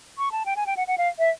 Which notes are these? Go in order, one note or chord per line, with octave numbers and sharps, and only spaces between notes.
C#6
A5
G5
G#5
G5
F#5
F#5
F5
E5